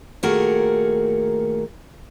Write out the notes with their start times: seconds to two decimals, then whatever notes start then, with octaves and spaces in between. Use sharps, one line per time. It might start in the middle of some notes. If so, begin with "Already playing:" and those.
0.23 A#2 D#3 A3 F#4 G#4 A#4